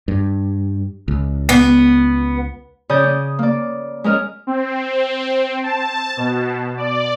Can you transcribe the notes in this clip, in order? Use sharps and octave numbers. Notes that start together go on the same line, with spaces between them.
G2
C#2
B3
C#3 D5 D#6 G6
C#4
A#3 D5
G#3 C#4 A#4 D#5 F6
C4
A5
B2
D5